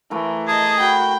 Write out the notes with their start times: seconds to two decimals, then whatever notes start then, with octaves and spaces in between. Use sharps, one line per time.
0.11 E3 A3 A#4
0.48 G#4 D#5 A5
0.80 F#4 G5 B5